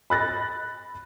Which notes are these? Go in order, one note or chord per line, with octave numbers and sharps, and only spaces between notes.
B5 F#6 A6 A#6